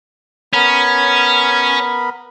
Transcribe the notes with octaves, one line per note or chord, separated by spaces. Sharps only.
B3 C#4 A#4 B5